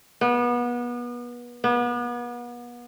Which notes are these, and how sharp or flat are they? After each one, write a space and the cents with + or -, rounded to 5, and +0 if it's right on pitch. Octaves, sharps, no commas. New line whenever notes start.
B3 -30
B3 -35